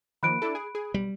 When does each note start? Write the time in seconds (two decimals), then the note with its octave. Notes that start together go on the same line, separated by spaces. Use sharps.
0.23 D#3 F3 A#3 B5 F#6 D7
0.42 D4 E4 A4
0.55 G#4
0.75 G#4
0.94 B1 G3